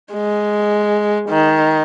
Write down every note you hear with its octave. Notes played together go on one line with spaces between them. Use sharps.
G#3
D#3